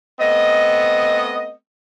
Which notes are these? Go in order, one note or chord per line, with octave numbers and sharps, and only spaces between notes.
A3 B3 C4 D#5